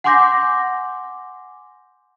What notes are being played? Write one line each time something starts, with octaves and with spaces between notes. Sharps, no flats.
F#5 G#5 C6 D6 G6 A#6